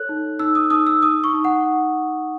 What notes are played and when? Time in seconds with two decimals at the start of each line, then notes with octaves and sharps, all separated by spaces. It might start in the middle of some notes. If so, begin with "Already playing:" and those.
Already playing: A4 C#5 F#6
0.09 D#4
0.39 D#4 E6
0.55 D#6
0.70 D#4 D#6
0.87 E6
1.02 D#4 D#6
1.24 C#6
1.34 D#4
1.44 F#5